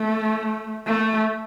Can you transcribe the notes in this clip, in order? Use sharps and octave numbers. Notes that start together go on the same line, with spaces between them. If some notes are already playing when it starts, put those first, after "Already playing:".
Already playing: A3
A3